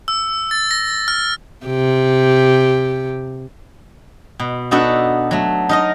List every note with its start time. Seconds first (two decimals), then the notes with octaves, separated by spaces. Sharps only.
0.08 E6
0.51 A6
0.71 A#6
1.08 F6
1.66 C3 G4
4.40 B2
4.71 B3 D4 D#4 F#4 A4
5.31 F#3 A3
5.69 D#4 A#4 D#5